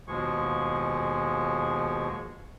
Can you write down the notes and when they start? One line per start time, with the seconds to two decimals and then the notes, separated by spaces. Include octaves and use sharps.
0.08 D#2 B2 F3 G#3 G#4 C#6